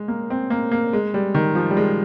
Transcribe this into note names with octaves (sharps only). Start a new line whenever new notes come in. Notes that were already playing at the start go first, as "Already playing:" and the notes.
Already playing: G#3
A#3
C4
A#3
A#3
G#3
G3
D#3
F3
G3
G#3